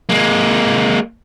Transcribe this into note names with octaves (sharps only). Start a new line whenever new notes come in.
G#3 A#3